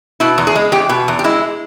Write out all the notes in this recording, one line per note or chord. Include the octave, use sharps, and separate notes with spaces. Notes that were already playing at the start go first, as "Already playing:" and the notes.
B2 E4
E2
G#4
G#3
E2 G4
B2
E2
G4
G#3 E4